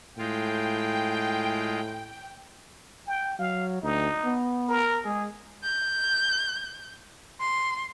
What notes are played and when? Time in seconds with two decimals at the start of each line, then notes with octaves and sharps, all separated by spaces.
0.18 A2 G#3 F4 G5
3.07 G5
3.39 F#3 F5
3.83 D2 D#4
4.24 B3
4.69 A#4
5.05 G#3 G#4
5.64 G6
7.40 C6